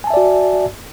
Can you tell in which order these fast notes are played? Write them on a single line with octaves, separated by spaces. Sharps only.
G#5 A5 E5 D5 F#4